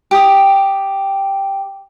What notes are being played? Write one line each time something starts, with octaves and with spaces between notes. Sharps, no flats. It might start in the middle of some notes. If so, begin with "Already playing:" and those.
G4 D#6